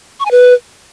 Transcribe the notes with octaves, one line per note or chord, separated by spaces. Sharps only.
C#6
G#5
B4